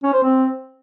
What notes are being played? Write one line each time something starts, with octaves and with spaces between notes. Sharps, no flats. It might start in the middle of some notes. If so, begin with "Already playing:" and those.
C#4
C5
C4